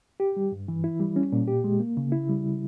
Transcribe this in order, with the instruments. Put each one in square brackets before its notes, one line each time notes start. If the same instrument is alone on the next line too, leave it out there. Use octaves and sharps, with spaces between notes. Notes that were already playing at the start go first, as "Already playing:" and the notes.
[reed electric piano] G4
G3
G2
E3
E4
G3
C#4
A#2
G4
G#3
A#3
C#3
E4
G3